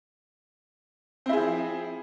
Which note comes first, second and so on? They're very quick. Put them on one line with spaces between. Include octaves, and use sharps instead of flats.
C4 E4 G#4 F3